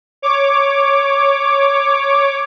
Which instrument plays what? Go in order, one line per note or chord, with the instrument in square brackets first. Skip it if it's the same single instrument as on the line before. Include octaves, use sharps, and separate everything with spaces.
[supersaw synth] C#5 D6